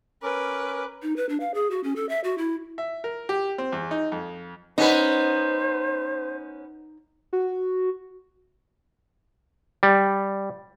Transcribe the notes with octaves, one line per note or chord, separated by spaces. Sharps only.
C#4 A#4 B4 D6
D#4
B4
D4
F5
G#4
F#4
C#4
A4
E5
F#4
E4
E5
A#4
G4
C4
E2
D#4
F2
B3 C#4 D#4 B4 C5
F#4
G3